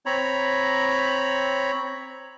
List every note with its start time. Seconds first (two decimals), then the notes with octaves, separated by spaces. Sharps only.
0.06 C4 C#5 A#5 B5